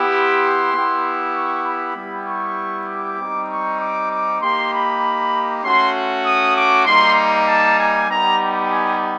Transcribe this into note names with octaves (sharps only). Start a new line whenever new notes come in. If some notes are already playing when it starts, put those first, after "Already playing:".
Already playing: B3 E4 G4
C6
B3 E4 G4
C#6
B5
G3 B3 E4 G4
C#6
D6
G3 C4 D#4 G4
C#6
D6
D6
A#3 D#4 G4 C6
B5
A3 C#4 F#4 C6
D#6
D6
G3 A#3 D#4 C6
A5
G#5
G3 B3 D#4 G4 A#5
G#5